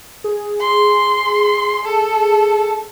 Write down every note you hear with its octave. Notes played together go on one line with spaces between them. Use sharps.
G#4
C6
A4